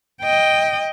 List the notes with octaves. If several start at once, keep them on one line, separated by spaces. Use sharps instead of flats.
D#5 G5